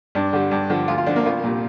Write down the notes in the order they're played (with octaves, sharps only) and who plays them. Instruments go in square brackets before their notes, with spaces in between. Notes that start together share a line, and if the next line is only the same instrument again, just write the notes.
[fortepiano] G2 D4
D3 G3
G2
D3 F3
D2 F4
F4
D3 F3 D4
A#3
C2 F4
A#2 G3